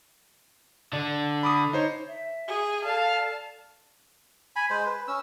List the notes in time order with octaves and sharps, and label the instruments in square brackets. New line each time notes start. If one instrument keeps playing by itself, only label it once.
[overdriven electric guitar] D3 D5
[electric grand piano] B5 D6 D#6
D#4 C5 C#5
[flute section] E5
[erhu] G#4
[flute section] A4 D5 [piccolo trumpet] F5 [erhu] A5
[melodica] G#5 B5
G#3 C5
B4
C#4 E6